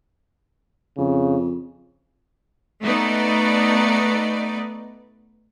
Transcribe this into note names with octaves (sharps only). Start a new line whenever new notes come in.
F2 C#3
A3 B3 D#4 D5